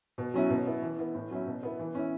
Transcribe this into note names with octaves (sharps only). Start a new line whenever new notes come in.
B2
F#3 C#4 E4
B2
B3 E4
E3
B3 E4
A2
F#3 C#4 E4
B2
B3 E4
E3
C#4 E4